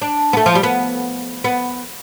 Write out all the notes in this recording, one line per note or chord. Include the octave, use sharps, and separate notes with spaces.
D4
B3
A3
F3
G3
B3
B3